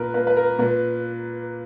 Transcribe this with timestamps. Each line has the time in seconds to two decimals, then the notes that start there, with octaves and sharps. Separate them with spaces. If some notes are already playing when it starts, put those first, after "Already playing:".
Already playing: A#2 A#4 B4
0.14 A#3 B4
0.27 B4
0.37 A#4
0.59 A#2 B4